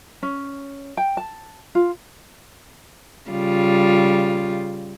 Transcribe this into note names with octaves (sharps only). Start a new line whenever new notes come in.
C#4
G5
A5
F4
C#3 G3 F4